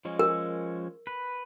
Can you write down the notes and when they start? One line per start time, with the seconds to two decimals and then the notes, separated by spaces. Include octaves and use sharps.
0.05 F3 G#3 C#4
0.19 A#4
1.07 B4